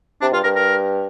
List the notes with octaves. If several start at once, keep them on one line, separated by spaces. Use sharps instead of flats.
C3 D4
G2 F4
G2 A#4
A#4